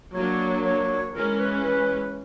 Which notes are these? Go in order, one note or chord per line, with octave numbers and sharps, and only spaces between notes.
F#3 A#3 D4 C#5
C#5
E3 G#3 C#4 A#4
B4
B4